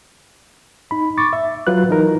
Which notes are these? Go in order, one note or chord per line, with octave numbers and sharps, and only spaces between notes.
D#4 B5
C#6 D6 A6
E5
F#3 F4 B4 F#6
E3 D#4 A#4